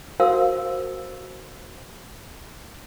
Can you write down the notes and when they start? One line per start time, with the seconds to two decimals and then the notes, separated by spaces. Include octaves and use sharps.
0.20 F#4 A#4 C5 F5 F#5 E6